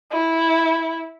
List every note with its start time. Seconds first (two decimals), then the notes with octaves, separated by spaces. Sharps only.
0.12 E4